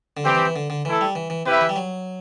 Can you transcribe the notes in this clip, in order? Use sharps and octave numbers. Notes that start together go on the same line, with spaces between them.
D3
E3 G3 C4 G4
E3
E3
D3
D3
E3 A3 E4 A4
G3
E3
E3
C3 E4 G4 B4 E5
E3
G3
F#3